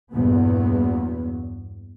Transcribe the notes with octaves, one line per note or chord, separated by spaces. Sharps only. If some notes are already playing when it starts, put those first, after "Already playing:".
E2 G2 A#2 F#3 B3